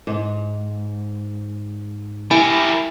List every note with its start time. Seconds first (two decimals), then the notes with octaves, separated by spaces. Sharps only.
0.07 G#2
2.31 G3 E4 A#4 G#5 B5 D7